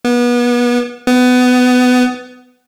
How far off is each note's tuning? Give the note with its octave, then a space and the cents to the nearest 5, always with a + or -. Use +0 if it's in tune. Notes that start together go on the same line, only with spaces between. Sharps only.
B3 -30
B3 +20